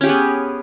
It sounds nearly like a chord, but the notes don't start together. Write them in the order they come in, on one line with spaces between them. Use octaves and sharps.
C#4 G4 G#4 B3